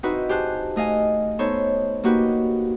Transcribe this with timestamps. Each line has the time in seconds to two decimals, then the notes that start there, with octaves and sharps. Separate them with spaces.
0.03 C4 D#4 E4 F#4 B4 C5
0.29 G4 G#4 C5 A5 F#6
0.76 A3 D#5 F5 G#5
1.39 B3 D#4 A4 C5 C#5
2.04 A#3 D#4 F#4 G4 B4